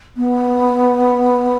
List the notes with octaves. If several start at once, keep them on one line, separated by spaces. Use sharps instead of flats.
B3